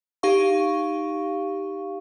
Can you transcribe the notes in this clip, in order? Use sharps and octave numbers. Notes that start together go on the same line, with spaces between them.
D#4 G4 F5 C#6